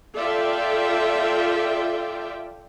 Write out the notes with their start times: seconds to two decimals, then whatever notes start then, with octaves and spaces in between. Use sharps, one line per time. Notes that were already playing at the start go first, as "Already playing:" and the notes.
0.15 F4 A4 D5 E5 G5